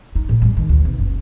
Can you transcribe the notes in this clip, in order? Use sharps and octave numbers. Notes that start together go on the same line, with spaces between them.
D#4
A2
G3
D#3
D2
B1
F#1